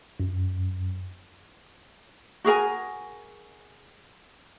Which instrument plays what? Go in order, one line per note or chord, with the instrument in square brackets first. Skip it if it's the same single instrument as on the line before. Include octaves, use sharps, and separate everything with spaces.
[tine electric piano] F#2
[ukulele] F#4 G#4 A#4 G#5